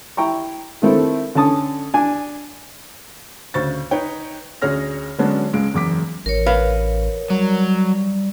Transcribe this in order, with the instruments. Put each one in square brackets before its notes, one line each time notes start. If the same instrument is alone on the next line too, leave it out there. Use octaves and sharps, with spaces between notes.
[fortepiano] E4 G5 A#5 C#6
D#3 A3 C4 E4 A4
D3 C#4 A5 D#6
D4 G#5
[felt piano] D2 C#3 C5 C#6 A6
D#4 B4 C#5 G5
D2 C#4 G#4 C#5 F6 A#6
D3 F#3 G#3 B3 C#4 D4
C#2 G#3 D7
F#1 E2 D6 B6
[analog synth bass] A1 [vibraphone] A#4 C#5
[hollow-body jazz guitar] B4 F5
[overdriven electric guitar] F#3 [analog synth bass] G3